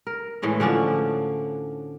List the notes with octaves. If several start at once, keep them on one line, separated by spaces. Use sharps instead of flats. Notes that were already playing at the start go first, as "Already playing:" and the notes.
A#4
A2 E3 G#3 A3
D3 F3 C#4 D4